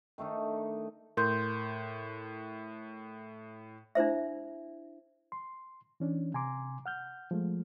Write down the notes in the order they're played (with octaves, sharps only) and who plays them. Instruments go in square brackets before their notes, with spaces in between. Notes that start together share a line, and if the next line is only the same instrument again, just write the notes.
[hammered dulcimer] D#3 A3 D4 D#4
[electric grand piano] A2 [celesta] A#4 C6 G6
[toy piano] D4 E4 C5 E5
[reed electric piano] C6
E3 C#4 D4
C3 G#5 A#5 C6 D6
F#5 F6 G6
F3 G#3 A3